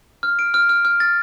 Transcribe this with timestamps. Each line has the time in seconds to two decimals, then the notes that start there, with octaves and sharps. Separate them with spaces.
0.23 F6
0.39 D7
0.54 F6
0.69 F6
0.85 F6
1.00 A6